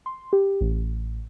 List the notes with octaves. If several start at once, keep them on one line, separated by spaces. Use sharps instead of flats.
C6
G4
A1